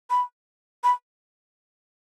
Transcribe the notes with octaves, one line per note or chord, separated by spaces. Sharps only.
B5
B5